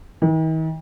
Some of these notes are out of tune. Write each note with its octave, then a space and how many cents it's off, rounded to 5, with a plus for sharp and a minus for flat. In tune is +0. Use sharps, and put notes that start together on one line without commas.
D#3 +45